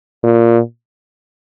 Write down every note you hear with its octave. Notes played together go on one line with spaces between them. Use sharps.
A#2